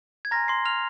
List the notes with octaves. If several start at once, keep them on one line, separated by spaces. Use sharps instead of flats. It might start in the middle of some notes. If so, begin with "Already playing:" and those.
G#6
G#5 A#5 C6 F6 A#6
C6 C7
F6 F7